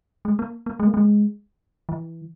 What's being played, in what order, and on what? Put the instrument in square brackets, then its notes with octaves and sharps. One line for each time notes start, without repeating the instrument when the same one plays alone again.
[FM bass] G#3
A#3
A#3
G#3
A#3
G#3
E3